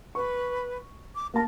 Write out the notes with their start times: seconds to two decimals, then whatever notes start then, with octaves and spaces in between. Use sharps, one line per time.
0.15 B4 C#6
1.15 D6
1.34 A#3 A#4 A5